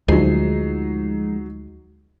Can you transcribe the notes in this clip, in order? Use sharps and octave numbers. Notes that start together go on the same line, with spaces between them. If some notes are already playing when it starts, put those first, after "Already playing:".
D2 F3 F#3 G#3 D#4 C7